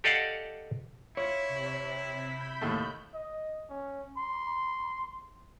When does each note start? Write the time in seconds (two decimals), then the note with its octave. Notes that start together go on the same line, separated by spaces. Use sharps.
0.04 G4 A4 D5 D#5 F5 F#5
1.17 E4 F4 C#5
1.48 C3 B6
2.32 B5 G6
2.61 D#2 A2 A3
3.14 D#5
3.69 C#4
4.17 C6